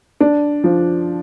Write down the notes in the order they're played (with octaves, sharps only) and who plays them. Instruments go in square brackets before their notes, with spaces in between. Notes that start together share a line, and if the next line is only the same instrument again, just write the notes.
[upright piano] D4
F3